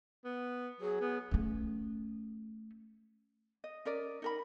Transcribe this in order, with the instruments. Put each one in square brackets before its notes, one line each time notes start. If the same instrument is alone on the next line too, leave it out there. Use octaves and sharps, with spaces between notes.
[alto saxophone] B3
[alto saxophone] F#3 [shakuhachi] G#4
[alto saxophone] B3
[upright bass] A3 C#4
[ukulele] D#5
C#4 A#4 D5 D#5
D#4 A#4 B5